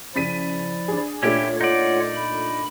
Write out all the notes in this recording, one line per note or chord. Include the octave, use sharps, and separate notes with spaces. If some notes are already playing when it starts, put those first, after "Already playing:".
C#3 F3 E4 D5 B6 D#7
D4 G#4
A#2 A3 C#4 D4 E4 G4 C#5
D#4 F4 C#5 D5 F#5
B5